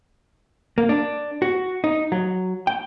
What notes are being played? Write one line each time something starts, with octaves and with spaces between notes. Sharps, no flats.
A#3
D4
F#4
D#4
F#3
G5